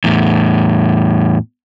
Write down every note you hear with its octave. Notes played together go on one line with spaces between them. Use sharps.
E2 A2